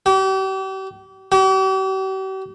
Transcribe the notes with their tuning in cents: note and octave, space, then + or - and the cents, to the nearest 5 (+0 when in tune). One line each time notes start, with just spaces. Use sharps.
G4 -40
G4 -45